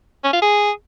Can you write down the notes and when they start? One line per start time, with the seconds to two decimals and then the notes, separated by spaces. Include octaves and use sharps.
0.24 C#4
0.33 F4
0.41 G#4